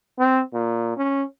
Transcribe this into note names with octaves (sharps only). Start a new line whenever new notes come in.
C4
A#2
C#4